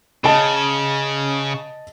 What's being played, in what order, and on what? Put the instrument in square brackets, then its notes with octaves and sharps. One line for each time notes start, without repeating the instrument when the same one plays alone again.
[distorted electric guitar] C#3 [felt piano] D#5 A5